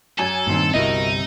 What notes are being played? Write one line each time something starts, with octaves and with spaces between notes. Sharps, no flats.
F#2 A4 G#5 G#6
G2 A#2 D#3 C4
G1 C2 C3 D#4 E4 F#4 A#4 D#5